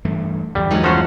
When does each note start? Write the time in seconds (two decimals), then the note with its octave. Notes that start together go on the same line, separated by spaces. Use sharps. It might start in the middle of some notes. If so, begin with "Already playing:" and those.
0.05 G2 E3 A3
0.55 E2 G2 D3 G3
0.71 E3 F#3 G#3 D#4
0.84 F3 C#4 F#4 C5